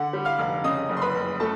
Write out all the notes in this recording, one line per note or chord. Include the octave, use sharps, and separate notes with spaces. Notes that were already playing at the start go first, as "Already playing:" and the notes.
Already playing: D3 F#5
G3
F5 F6
F1
C#3 D#5 D#6
F#1
C6
B4 B5
F#1
A3 A4 A5